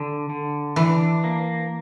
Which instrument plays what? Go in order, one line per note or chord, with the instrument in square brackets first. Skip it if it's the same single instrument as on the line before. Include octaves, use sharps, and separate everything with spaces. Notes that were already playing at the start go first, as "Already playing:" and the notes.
Already playing: [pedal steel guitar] D3
D3
[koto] E3 [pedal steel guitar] D4
[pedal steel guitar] A#3